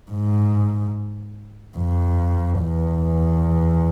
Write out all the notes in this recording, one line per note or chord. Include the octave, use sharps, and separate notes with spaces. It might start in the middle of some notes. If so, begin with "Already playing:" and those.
G#2
F2
E2